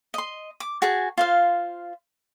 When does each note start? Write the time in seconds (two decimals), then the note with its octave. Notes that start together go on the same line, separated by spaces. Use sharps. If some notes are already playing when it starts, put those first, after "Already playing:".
0.14 D#5 C6
0.60 D6
0.82 F#4 G#4 G#5 A5
1.18 F4 C5 F5